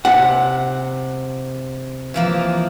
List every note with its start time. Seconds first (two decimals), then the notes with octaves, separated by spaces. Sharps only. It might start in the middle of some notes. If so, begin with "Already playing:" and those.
0.05 C3 F#5
2.14 E3 F3 A#3